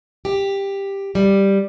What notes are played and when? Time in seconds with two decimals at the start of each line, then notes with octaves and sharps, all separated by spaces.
0.25 G4
1.15 G3